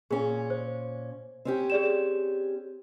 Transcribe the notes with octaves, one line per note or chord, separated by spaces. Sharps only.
A#2 C#4 G#4
C5
C4 C#4 G4
G#4 D5 E7